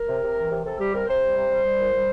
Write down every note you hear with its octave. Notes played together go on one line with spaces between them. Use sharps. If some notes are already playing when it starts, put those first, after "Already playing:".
Already playing: A#4
C3
C3
E3
C3
C3 A4
G3 G4
C3 A#4
C3 C5
G3
C3
G3
G3
A#2
G3